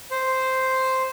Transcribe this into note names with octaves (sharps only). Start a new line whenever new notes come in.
C5